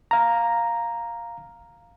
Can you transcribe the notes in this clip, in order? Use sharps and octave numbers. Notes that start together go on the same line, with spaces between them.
F5 A#5